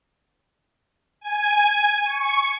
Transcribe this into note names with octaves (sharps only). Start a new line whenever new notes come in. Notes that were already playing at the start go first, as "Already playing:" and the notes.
G#5
C#6